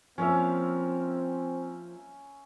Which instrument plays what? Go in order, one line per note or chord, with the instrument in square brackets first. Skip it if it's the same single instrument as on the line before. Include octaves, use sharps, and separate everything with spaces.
[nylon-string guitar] F3 A#3 [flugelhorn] C4 [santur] C#4 A#4 E5